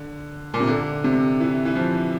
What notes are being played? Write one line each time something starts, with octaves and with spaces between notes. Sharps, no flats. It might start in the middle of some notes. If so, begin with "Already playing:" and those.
Already playing: D3
A#2
C3
D3
C3
E3
E3
F3